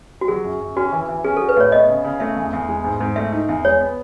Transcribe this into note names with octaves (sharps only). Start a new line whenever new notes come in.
F#4
F#3 G#4
F#2
F#2
C#4 F#4
E3
E3
C#4 G#4
F#4 A4
B4
A2 C#5
B3 D#5
C#3
C#3
A3 E5
E2
E2
G#3
G#2
G#2
A3 E5
D#4
E2
G#3 C#5
B3